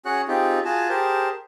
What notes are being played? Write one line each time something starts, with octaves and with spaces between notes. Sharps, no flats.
C#4 F#4 G#4 C#5 F#5 F#6
C4 D#4 F4 G4 G#4
F4 F#4 G#4 G#5 A5
G4 G#4 A#4 C5 A5